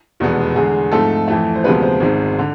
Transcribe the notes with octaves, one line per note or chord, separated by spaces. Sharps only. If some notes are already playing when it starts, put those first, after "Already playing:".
F1 E2 B2 G#3 B3
E2 D3 G#3 G#4
G#2 F3 A3 C4 A4
F2 E3 A3
C5
D2 C3 F3 G#3 B3 B4
C5
G#1 G#2 G#3 C4
D3